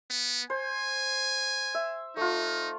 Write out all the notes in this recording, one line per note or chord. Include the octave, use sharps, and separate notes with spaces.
B3
C5 G#5
E5
A3 D#4 F4